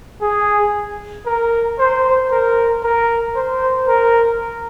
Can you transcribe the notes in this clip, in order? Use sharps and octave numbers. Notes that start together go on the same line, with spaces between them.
G#4
A#4
C5
A#4
A#4
C5
A#4